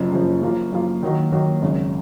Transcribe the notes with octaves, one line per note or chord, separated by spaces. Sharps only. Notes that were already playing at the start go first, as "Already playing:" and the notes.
Already playing: F#1 F#2 F3
F#1 F#2 F3
F#2 F3 A#3 F4
F#2 F3 A#3 F4
D#3 F#3 A#3 D#4 F#4
D#3 F#3 A#3 D#4 F#4
G#1 F#2 C#3